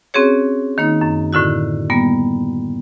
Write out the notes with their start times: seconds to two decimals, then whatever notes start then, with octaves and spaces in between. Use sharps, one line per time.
0.14 C4 C#4 F#4 G#4 C#5
0.78 D#3 A#3 D#4
1.01 F#2
1.33 A2 D3 E4 F#4
1.90 G3 A#3 B3